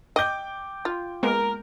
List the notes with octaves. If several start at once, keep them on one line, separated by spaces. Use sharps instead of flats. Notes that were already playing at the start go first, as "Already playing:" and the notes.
D#5 G5 D6 G6
F4
G#3 A#3 B3 A#4